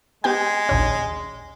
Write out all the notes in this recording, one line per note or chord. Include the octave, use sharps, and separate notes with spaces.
G#3 B3 G4 G5
A#1 D#2 C#4